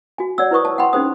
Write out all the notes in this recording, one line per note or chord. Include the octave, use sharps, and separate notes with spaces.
F#4 G#5
C#5 D5 F#5 E6
E4 B4 C5 C#6 D#6
A5
F#5 G5 B5 C6
C#4 D#4 G#4 C5 D#6